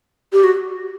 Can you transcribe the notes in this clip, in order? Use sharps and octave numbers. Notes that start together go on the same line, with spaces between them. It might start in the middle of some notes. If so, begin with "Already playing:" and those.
G4
F#4